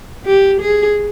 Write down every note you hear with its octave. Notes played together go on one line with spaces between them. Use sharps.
G4
G#4